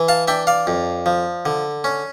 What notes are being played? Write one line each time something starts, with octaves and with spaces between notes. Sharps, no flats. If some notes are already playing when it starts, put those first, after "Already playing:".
Already playing: E3
F5 A5
D4 E5 G5
D5 F5
F2
F3
D3
C#4